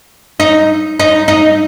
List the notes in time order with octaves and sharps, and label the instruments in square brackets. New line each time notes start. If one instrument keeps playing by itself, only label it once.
[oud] D#4
D#4
D#4